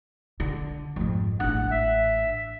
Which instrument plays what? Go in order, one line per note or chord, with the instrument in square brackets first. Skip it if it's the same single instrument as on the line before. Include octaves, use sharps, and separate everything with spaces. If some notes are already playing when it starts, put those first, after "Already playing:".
[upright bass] D3
F2 G#2
[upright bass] A1 D4 [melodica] F#5
[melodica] E5